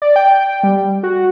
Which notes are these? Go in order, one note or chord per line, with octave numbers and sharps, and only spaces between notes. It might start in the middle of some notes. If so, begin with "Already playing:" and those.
D5
G5
G3
F#4